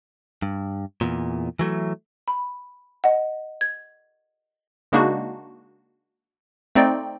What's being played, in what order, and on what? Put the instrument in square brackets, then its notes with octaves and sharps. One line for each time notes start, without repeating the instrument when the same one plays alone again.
[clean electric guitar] G2
E2 A#2
E3 F#3 A3
[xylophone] B5
D#5 F#5
G#6
[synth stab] C#3 G#3 A#3 D4 D#4 F#4
A3 C4 D#4 D5 G5